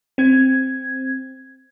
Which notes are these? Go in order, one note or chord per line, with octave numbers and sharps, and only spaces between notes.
C4 G#6